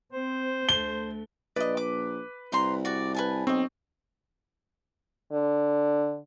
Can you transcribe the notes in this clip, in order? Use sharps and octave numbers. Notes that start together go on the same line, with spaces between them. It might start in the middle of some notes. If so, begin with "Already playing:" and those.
C4 C5
D2 A3 G7
A#1 B4 D5 D#5
D6
C2 C5 A#5 C6
F#4 D5
B4 G#5 A5
B1 C4 D#5 C#6
D3